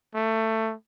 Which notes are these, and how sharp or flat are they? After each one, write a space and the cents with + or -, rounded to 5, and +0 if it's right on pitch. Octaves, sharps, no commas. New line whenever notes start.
A3 +15